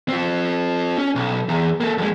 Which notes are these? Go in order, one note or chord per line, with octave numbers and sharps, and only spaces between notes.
C4 F4
C#4
B1
E2
A#3 A4
F2 G#3